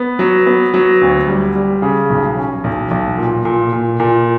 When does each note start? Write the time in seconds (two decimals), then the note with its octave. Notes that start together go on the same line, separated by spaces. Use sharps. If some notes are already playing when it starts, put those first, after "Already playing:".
Already playing: B3
0.19 F#3
0.46 B3
0.74 F#3
1.01 D2
1.28 G3
1.55 G3
1.82 C#3
2.10 B1
2.37 C#4
2.64 B1
2.91 B1
3.18 A#2
3.45 A#2
3.73 A#2
4.00 A#2